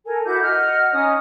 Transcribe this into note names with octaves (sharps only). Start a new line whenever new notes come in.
A4 A#4 G#5
E4 F#4 D6 G6
D#5 F#5 F6
C#4 D#4 D#6